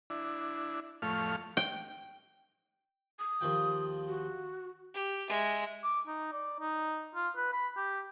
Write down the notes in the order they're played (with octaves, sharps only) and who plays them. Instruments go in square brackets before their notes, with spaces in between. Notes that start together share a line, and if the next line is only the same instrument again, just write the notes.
[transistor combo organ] D4 E4
F2 A2 A3 F5 C#6 F6
[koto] G5
[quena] D#6
[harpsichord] D#2 F3 G5
[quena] F#4
[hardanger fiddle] G4
G#3 E5
[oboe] D6
D#4
D5
D#4
F4
B4
B5
G4